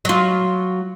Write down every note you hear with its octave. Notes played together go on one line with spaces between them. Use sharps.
F#3 F4